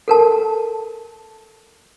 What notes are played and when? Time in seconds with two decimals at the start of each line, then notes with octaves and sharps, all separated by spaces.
0.08 A4 A#4 A5